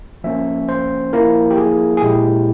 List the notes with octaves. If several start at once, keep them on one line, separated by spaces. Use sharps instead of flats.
F3 A#3 C#4 E5
C5
F3 A#3 E4 A#4
G4
G#4
G#4
A#2 G#3 E4 G4